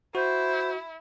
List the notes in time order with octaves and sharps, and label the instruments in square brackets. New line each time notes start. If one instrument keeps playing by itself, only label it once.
[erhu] E4 [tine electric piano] F#4 [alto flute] C5